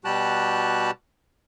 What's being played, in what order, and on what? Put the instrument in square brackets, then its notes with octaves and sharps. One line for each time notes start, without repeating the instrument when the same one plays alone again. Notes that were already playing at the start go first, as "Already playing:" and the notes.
[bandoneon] B2 G3 F#4 G4 A5 F#6